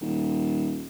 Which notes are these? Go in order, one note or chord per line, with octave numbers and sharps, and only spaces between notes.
D#1